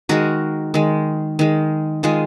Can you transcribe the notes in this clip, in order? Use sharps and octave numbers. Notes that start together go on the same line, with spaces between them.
D#3 G#3 F#4 A#4
D#3 G#3
D#3 G#3
D#3 G#3 F4 G#4